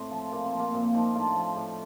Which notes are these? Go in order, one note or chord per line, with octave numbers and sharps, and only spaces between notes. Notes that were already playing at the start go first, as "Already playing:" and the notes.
Already playing: A2 C4
F3
A#2 A#3
C4
F3
A#3
A#2 C4
F3 C4 D#4
A2 D4 F4
F3
A2